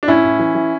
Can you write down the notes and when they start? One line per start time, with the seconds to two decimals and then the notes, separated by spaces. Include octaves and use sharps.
0.03 D4
0.07 A2 C#4 E4
0.24 A2
0.39 E3
0.55 E3